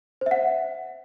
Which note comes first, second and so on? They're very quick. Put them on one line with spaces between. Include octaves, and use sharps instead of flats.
C5 E5 F#5